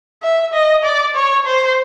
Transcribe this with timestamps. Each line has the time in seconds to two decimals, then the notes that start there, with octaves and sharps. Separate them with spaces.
0.23 E5
0.53 D#5
0.84 D5
1.15 C#5
1.46 C5